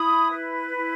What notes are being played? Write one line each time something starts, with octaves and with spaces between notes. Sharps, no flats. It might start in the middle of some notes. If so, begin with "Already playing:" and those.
Already playing: E4 B5 D#6
B4
E4